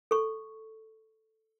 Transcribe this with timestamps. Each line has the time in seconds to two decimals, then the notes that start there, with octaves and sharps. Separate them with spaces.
0.11 A4 C#6